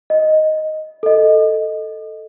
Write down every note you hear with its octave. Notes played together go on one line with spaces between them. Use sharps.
D#5
A4 D#5